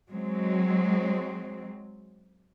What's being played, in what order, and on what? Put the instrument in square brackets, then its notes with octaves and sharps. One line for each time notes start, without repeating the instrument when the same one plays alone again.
[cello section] F#3 G#3 C4